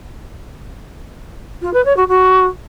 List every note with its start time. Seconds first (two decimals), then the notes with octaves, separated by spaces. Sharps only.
1.62 F4
1.74 B4
1.85 C#5
1.97 F#4
2.08 F#4